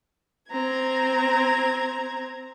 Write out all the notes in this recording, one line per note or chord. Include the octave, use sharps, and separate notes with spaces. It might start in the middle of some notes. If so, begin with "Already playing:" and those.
C4 A#5 G#6